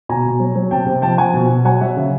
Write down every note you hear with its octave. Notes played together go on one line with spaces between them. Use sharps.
B2 G#5 A#5
B2
F#3
F#3
C3 G5 A5
C3
F3 G5 A5
F3 F#5 G#5
B2
B2
F#3 F#5 G#5
F#3 E5 F#5
C#3